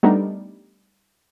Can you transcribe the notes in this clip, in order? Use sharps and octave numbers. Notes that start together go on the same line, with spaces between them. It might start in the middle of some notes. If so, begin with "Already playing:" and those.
G3 A3 B3 D4 D#4 A#4